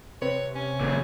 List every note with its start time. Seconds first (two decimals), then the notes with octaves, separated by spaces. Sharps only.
0.22 C3 C4 B4 C#5
0.55 C#4
0.81 F#1 A#2 C#3